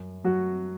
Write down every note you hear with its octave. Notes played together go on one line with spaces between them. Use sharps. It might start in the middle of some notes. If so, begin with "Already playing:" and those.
Already playing: F#2
F#3 F#4